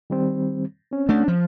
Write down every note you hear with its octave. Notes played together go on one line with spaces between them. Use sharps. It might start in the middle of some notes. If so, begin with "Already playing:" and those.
D#3 G3 C4
C4 C#4
A3 D4
F3